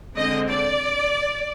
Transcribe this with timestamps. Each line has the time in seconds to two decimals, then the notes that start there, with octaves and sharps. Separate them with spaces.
0.16 D3 G#3 C4 D#5
0.48 D5